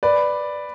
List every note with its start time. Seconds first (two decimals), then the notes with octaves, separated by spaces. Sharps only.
0.03 B4 D5